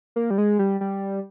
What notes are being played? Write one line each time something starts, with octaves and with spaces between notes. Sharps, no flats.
A#3
G3
G#3
G3
G3